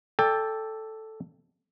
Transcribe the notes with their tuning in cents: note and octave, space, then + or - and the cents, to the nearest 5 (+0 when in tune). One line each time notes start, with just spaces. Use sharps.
A4 +0 D5 -10 G5 +20